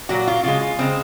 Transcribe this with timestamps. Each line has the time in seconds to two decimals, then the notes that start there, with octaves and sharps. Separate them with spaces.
0.09 A#2 F#3 F#4
0.27 F4
0.43 C#3 G#3 F4
0.61 F4
0.79 C#3 G#3 C4